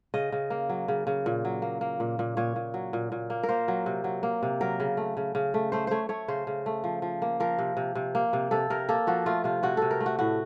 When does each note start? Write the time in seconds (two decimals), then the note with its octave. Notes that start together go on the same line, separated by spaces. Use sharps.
0.14 C#3 D#5
0.32 C#3
0.50 A#3
0.70 F#3
0.88 C#3
1.07 C#3
1.26 A#2
1.45 F#3
1.62 A#3
1.81 A#3
2.00 A#2
2.19 A#2
2.37 A#2 C#5
2.56 A#2
2.74 F#3
2.93 A#2
3.12 A#2
3.30 A#3
3.43 A#4
3.49 A#3 C5
3.68 F#3
3.86 C3
4.04 F#3
4.23 A#3
4.43 C3
4.61 F#3 A#4
4.80 C#3
4.97 A3
5.17 C#3
5.35 C#3
5.54 A3
5.72 A3 C5
5.87 A3 C5 C#5
6.09 A3 C#5
6.28 C#3 C5
6.47 C#3
6.66 A3
6.84 F3
7.02 F3
7.22 A#3
7.40 F3 A#4
7.59 C3
7.77 C3
7.95 C3
8.15 A#3
8.33 C3
8.51 C3 A4
8.70 C3 A#4
8.89 A#3 A4
9.07 F3 F#4
9.26 A3 F4
9.44 C3 F4
9.63 C3 F#4
9.77 C3 A4
9.91 A#4
10.00 A3
10.06 F#4
10.19 A2 F#4